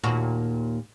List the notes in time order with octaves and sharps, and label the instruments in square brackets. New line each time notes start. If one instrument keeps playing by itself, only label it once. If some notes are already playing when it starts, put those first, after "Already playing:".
[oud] D#2 A#2 F#4